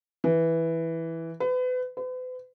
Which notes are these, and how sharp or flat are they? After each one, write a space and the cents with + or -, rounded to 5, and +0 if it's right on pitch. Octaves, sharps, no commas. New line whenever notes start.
E3 -5
B4 +35
B4 +45